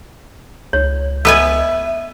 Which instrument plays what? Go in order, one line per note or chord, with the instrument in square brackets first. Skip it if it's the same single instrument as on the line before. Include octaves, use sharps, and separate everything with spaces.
[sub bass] C#2 [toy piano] C#5
[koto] B3 B4 G#5 [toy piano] D#5 E6 [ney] E5